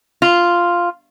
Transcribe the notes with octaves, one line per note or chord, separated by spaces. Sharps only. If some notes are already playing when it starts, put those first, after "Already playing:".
F4